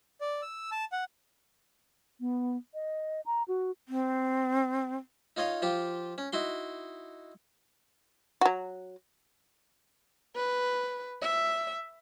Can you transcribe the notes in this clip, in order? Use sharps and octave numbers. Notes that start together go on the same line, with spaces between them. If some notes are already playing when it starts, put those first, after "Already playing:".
D5
E6
A5
F#5
B3
D#5
A#5
F#4
C4
D#4 F4 C#5 D#5 F5
F3 F4 G4
C#4
D#4 E4 F#4 C6
F#3 F#4
B4
E5